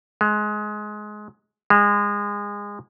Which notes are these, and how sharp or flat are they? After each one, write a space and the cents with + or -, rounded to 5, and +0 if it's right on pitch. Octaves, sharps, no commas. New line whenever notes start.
G#3 +20
G#3 -25